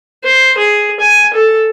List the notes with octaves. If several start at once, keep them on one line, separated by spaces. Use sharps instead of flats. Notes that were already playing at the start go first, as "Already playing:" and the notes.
C5
G#4
G#5
A4